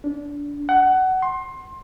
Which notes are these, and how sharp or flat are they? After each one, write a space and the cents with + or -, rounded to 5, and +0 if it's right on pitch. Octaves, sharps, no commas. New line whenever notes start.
D4 -25
F#5 +20
C6 +25